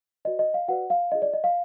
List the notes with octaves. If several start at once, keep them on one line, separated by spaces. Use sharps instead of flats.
F#4 B4 D5 D#5
D#5
F5
F#4 B4 D5 F#5
F5
D4 F4 G#4 D#5
D5
D#5
F5